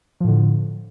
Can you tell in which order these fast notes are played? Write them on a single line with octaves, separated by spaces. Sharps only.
F3 A2 D3